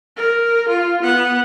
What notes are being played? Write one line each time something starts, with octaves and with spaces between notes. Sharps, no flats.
A#4
F4
B3 F#5